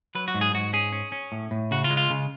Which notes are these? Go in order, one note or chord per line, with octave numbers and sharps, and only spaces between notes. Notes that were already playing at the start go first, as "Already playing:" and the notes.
F#3 B4
F#4
G#2
G#4
G#2 F#4
C#4 G#4
C#4
C#4
A2
A2
C#3 F#4
F4
G#3
F4
C#3